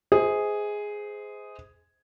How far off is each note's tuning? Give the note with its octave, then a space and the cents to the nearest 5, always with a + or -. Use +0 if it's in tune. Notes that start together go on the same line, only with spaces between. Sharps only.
G#4 +0 C5 -20 D#5 +40